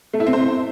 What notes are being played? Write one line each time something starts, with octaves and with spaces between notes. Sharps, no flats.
A3
E4
C4
C5